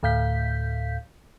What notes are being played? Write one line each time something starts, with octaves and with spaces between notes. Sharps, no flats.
D2 A2 F5 G6 B6